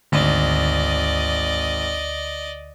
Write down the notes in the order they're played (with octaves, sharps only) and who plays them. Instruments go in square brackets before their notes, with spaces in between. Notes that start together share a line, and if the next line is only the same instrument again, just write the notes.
[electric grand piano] G#1 [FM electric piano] D2 [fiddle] D5 D#5